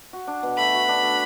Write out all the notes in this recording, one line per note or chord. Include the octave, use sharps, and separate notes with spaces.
F#4
D4
B2
A3 B5
F#4
D4
A3